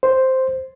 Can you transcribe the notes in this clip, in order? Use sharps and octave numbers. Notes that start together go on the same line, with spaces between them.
C5